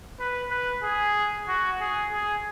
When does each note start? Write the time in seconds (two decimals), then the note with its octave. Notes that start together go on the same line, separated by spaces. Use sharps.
0.20 B4
0.51 B4
0.83 G#4
1.48 F#4
1.81 G#4
2.13 G#4